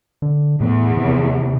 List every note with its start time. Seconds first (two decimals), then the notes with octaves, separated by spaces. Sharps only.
0.22 D3
0.61 E2 A2
0.97 C3